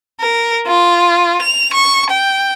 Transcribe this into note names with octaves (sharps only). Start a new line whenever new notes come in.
A#4
F4
F7
C#6
G5